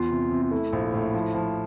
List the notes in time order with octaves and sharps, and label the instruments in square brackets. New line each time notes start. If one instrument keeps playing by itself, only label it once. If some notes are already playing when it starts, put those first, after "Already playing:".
Already playing: [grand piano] E2 [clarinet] F4
[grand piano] C3
C3
[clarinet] F4
[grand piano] A3 [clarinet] E4
[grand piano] A#1
A2
F3
F3